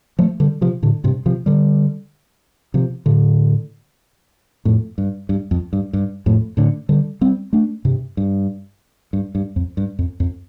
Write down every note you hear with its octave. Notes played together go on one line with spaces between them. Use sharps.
F3 A3
D3 G3
C3 F3
A2 D3
G2 C3
C3 F3
D3 G3
C3 F3
A2 D3
F2 A2
G2
G2
F2
G2
G2
F2 A2
A2 D3
D3 G3
G3 C4
A3 D4
G2 C3
G2
G2
G2
F2
G2
F2
F2